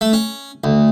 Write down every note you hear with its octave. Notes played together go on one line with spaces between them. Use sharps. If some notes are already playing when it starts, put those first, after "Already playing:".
A3
C#4
D2